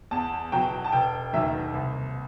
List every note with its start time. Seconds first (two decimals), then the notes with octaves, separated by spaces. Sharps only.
0.11 E2 A5
0.52 B2 F#3 G5
0.84 A5
0.92 E1 G5
1.33 D#2 D#3 F#3 E5
1.73 C2